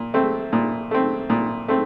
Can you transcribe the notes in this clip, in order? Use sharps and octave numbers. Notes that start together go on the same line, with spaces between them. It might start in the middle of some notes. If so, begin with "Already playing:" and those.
Already playing: A#2
A3 C4
A#2
A3 C4
A#2
A3 C4